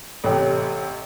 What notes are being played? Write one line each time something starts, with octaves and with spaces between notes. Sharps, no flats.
A1 C3 A4 C#5 G5